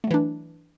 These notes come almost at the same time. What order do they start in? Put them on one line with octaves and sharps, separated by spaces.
A3 F#3 E3 D4